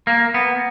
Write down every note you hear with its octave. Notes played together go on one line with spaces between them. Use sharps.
A#3
B3